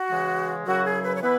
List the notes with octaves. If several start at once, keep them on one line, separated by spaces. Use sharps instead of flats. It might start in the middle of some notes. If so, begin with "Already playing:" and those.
Already playing: F#4
C#3 E3 G#3
F#2 C#3 F#3 E4 F#4
G#4
B4
C#5
E3 B3 E4 B4